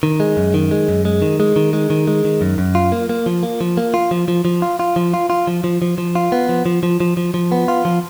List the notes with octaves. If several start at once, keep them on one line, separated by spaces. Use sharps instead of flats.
D#3
G#3
F#2
D#3
G#3
F#2
G#3
D#3
G#3
D#3
G#3
D#3
G#3
D#3
F#2
F#2
F4
A#3
A#3
F3
A#3
F3
A#3
F4
F3
F3
F3
F4
F4
F3
F4
F4
F3
F3
F3
F3
F4
B3
F3
F3
F3
F3
F3
F3
B3
F4
F3